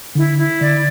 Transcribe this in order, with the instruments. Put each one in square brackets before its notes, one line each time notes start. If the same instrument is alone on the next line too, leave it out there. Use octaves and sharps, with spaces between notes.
[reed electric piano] D3 [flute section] E4
[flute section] E4
[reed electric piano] D3 [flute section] D5